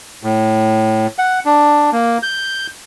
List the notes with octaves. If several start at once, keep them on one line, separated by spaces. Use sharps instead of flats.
A2
F#5
D4
A#3
G6